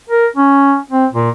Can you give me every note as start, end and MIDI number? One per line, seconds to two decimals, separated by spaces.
0.10 0.27 70
0.37 0.78 61
0.91 1.06 60
1.13 1.31 46